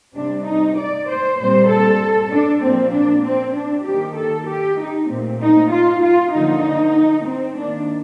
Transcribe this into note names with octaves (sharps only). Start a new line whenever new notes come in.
C3 G3 C4 D4
D#4
D5
C5
A#2 G3 C4 C5
A4
D4
A#2 F3 A#3 C4
D4
C4
D4
D#3 A#3 G4
A4
G4
D#4
A#2 A3 C4
D#4
F4
F4
D3 F3 A#3 D#4
C4
D#3 A#3 D4